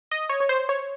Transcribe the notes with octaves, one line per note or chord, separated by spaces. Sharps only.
D#5
C#5
C#5
C5
C#5